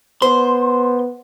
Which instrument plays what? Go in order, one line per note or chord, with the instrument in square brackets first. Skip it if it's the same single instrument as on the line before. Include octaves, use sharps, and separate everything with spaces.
[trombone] B3 [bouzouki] C5 [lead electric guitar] C6